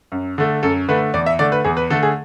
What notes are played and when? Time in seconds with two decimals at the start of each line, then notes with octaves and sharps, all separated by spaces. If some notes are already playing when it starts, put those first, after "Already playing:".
0.12 F#2
0.38 D3 A3
0.63 F#2 A4
0.88 D3 A3 B4
1.14 E2 D5
1.26 E5
1.39 D3 A3 D5
1.52 B4
1.64 E2 G#4
1.77 B4
1.90 D3 A3 A4
2.03 G#4